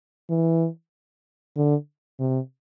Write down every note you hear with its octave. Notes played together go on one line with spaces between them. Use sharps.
E3
D3
C3